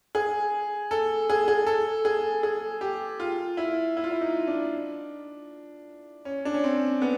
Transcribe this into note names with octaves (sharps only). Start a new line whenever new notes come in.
G#4
A4
G#4
G#4
A4
G#4
G#4
G4
F4
E4
E4
F4
E4
D#4
D4
C#4
D4
C#4
C4
B3